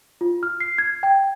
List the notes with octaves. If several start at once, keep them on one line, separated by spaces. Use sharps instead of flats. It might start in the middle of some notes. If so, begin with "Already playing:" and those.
F4
F6
C7
G#6
G5